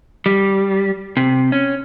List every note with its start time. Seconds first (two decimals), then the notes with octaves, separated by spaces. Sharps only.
0.26 G3
1.17 C3
1.52 C#4